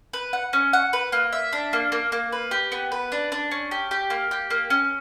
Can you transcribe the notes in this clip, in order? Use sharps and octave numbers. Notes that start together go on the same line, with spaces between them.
B4
F#5
C#4
F#5
B4
A#3
E5
D4
A#3
A#3
A#3
B4
G4
B3
B4
D4
D4
C#4
G4
G4
A#3
G4
A#3
C#4